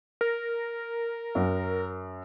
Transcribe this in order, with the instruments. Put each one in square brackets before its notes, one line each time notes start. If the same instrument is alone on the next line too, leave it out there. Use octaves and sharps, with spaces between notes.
[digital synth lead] A#4
[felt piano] F#2